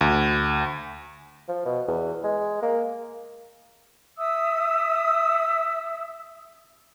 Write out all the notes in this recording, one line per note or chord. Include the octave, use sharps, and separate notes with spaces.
D2
F3
B2
E2
G#3
A#3
E5 D#6 E6